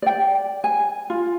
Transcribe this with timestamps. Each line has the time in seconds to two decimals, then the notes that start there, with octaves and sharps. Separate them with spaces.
0.02 D5 G5
0.64 G#5
1.10 F4